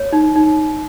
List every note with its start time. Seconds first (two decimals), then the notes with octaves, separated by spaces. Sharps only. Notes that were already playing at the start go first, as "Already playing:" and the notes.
Already playing: C#5
0.13 D#4
0.36 D#4